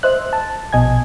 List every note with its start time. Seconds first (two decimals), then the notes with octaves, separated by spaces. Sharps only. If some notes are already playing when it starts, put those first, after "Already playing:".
0.03 C5 D#5 E5 F#6
0.33 A5
0.73 A#1 B2 D#5 G#5 G#6